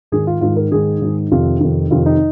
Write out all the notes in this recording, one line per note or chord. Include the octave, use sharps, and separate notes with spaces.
G#2 D#3 G#4
F4
G#2 D#3 F4
A#4
G#2 D#3 G#4
G#2 D#3
F2 C3 D#3 F4
F2 C3 D#3
F2 C3 D#3 F4
D#4